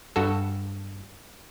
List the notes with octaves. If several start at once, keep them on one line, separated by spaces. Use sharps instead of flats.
G2 F#4 A4